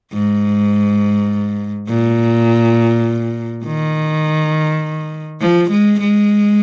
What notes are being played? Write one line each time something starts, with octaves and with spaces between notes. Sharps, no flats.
G#2
A#2
D#3
F3
G#3
G#3